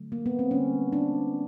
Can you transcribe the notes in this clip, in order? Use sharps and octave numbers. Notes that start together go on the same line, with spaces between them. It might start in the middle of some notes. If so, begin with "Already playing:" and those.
Already playing: D3 F#3 A3
A#3
B3
C4
D3 G3 A#3 C#4
D4